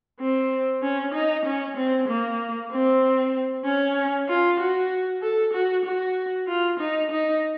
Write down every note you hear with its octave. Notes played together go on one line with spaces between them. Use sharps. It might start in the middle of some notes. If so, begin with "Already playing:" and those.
C4
C#4
D#4
C#4
C4
A#3
C4
C#4
F4
F#4
A4
F#4
F#4
F4
D#4
D#4